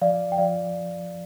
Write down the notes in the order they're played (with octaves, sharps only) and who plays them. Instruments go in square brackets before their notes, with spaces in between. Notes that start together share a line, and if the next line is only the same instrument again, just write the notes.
[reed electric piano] F3 [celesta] D5 F5
[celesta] G5
[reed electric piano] F3 [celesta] D5 F5